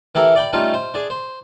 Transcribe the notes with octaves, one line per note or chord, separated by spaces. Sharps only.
E3 E4 G4 A4 A#4
D5 G5 B5
G3 A3 C#4 D#4 F4
C5
D4 G#4
C5